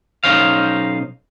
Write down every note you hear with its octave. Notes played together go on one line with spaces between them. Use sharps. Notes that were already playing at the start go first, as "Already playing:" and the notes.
B1 C#4 D#4 C5 F5